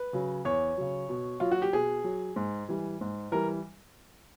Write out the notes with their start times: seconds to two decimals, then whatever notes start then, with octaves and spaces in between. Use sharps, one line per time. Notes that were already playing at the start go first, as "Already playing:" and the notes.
Already playing: B4
0.13 C#3 F#3
0.45 E2 C#5
0.77 C#3 F#3
1.09 B2
1.40 F#3 F4
1.51 F#4
1.62 G4
1.73 B2 G#4
2.04 F#3
2.36 G#2
2.69 E3 G3
3.01 G#2
3.32 E3 G3 A#4